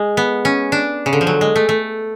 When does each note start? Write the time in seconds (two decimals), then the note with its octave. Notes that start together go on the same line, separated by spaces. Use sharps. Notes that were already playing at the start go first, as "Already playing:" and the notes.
Already playing: G#3
0.17 B3
0.45 C#4
0.72 D4
1.06 C#3
1.13 D3
1.21 F3
1.27 F#3
1.41 G#3
1.56 A3
1.69 A3